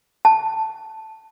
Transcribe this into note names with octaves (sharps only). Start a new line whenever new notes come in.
A5